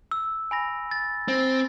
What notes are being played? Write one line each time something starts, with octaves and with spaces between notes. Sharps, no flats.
E6
G#5 B5 A#6
A6
C4 A6